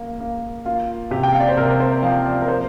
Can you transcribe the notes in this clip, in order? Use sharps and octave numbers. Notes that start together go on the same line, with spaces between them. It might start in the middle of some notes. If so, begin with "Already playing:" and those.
Already playing: A#3
A#3
A#3 F4
C3 G4
G5
F5
D5
C5
C3 A#4
C5
F3 F5
D5
A#4
A#3 C5